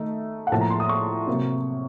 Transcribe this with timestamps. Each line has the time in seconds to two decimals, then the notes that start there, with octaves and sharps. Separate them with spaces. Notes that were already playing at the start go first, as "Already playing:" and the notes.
Already playing: D#3 A3 D#4
0.47 F#5
0.51 A2 F3 A#3 A5
0.61 A#5
0.70 C6
0.80 D#6
0.89 C#6
1.27 C3 F#3 A#3